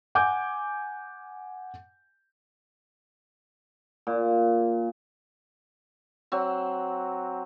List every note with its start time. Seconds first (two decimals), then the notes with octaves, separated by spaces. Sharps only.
0.15 F#5 G#5 D6 G6
4.07 A#2
6.32 F#3 C4